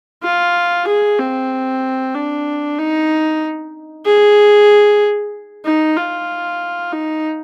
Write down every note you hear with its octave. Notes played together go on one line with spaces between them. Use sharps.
F4
G#4
C4
D4
D#4
G#4
D#4
F4
D#4